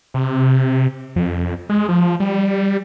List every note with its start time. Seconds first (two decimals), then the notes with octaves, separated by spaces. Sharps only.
0.14 C3
1.16 F2
1.69 G#3
1.89 F3
2.20 G3